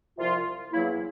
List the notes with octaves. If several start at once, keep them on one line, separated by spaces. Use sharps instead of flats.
C2 C3 F3 A#3 F4
E2 C#3 F#3 A#3 E4